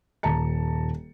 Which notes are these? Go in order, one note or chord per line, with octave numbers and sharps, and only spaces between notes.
D#1 A5 A#5 C#7